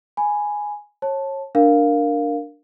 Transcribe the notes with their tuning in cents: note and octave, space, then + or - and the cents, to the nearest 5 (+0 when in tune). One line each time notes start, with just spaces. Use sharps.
G#5 +0 B5 +0
C#5 -30 A5 +0
D4 +0 A#4 +0 F5 +0